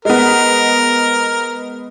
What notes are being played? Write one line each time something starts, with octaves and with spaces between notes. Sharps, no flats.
G#3 B3 A#4